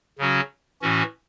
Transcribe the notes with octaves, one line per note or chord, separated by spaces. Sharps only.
C#3 F#3 C#4 F#4
A2 E3 C#4 F#4